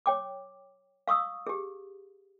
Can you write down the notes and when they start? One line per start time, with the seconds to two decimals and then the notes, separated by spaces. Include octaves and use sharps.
0.06 C#5 G5 D6
1.08 F5 C#6 D#6 E6
1.47 G4 G#4